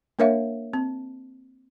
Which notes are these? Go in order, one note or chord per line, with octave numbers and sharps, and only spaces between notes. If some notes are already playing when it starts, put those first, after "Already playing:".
A#3 D4 A#4 C#5 E5 F5
C4